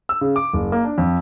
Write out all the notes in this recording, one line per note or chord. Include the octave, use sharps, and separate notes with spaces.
E6
C#3
D6
F#1
A#3
D4
F2